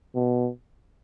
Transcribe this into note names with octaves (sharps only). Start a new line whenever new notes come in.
B2